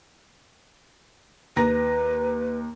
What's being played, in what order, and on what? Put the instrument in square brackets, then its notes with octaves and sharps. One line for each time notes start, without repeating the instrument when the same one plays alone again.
[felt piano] D#2 A#5 A#6 [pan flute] B4